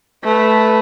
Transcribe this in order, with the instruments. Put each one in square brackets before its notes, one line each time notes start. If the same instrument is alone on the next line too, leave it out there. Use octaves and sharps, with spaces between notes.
[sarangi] A3 [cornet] B4